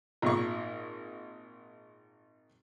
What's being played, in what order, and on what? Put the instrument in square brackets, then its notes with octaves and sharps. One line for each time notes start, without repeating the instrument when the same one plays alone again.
[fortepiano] G#1 A#2 C#6